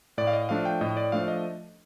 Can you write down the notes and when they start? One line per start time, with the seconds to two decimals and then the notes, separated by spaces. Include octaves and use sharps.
0.18 A2 D5
0.27 F5
0.33 D#5
0.49 F3 A3 D4 F5
0.65 G5
0.81 A2 D#5
0.97 D5
1.12 F3 A3 D4 F5
1.28 D#5